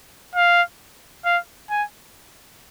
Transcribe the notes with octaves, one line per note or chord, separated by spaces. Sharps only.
F5
F5
G#5